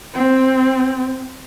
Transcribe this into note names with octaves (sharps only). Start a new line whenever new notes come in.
C4